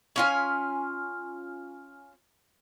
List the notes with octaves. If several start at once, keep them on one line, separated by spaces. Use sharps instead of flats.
C#4 F4 G#5